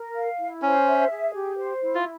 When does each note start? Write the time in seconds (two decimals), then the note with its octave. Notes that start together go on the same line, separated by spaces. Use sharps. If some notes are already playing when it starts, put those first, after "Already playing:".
Already playing: A#4
0.15 F5
0.39 E4
0.62 C#4 C5
0.86 E5
1.10 G#4
1.33 G4
1.58 C5
1.81 E4
1.95 F4